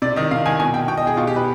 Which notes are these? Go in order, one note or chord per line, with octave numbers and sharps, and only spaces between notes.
C3 D5
D#3 D#5
C3 F5
D#3 G#5
B2 G#5
G5
B2 G5
D#5
G#4
B2 F4
G4
B4